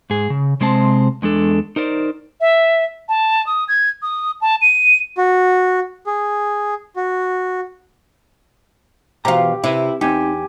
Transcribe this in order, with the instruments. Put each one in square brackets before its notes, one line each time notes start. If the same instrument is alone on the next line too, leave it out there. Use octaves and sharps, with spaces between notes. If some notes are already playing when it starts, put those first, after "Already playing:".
[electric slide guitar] G#2 G#4
C#3
C3 G#3 C4 C5 A5
E2 G#3 D4 A4
D#4 A#4 C5 D5
[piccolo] E5
A5
D#6
G#6
D#6
A5
D#7
[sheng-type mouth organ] F#4
G#4
F#4
[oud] B2 F4 [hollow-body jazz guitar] E3 C5 A#5 [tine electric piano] G4
[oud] C3 [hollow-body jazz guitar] E4 B4
[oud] E2 [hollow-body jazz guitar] C4 D#4 [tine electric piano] G4 G#5